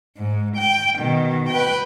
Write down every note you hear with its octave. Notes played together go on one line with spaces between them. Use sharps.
G#2
G5
B2 D#3
B4 G5